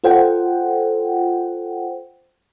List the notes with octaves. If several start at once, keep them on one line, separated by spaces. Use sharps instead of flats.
F4 A4 C5 F#5 G5